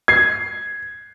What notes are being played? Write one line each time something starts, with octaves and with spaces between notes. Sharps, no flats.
G#6 C7